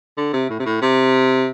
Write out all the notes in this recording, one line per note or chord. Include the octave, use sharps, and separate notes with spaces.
D3
C3
A2
C3
A2
C3